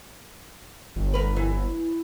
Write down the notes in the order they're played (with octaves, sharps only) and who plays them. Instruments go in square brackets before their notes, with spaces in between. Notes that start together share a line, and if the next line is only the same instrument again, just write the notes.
[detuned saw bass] G1
[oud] A#4 B4
E3